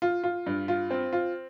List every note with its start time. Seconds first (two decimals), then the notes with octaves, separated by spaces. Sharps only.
0.02 F4
0.23 F4
0.46 G2
0.68 F4
0.91 C4
1.13 F4